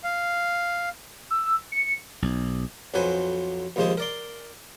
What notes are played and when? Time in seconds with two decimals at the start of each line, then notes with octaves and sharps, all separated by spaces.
0.04 F5
1.30 E6
1.72 C#7
2.22 B1
2.94 B1 F2 F#3 B4 C5 G#5
3.76 A#1 D#2 F3 G#3 C5 D#5
3.98 A#4 D5 C6